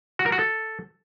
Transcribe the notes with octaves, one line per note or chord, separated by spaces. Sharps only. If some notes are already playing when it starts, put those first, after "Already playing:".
F#4
A#4
F#4
A4